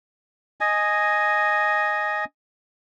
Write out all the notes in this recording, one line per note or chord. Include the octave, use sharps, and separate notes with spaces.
D#5 G#5